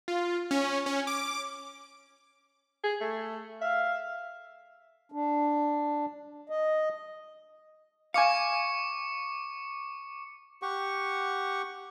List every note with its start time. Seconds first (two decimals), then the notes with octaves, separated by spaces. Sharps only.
0.08 F4
0.51 C#4
0.86 C#4
1.07 D6
2.84 G#4
3.01 A3
3.62 E5 F5
5.12 D4
6.50 D#5
8.14 F5 G#5 C#6 D6 C#7
10.62 G4 F#5 C#6